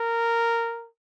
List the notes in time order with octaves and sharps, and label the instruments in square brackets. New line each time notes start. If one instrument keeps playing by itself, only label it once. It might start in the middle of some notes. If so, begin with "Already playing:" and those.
Already playing: [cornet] A#4